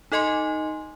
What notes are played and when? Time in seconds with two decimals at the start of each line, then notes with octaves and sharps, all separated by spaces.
0.12 D#4 A4 D#5 G#5 C6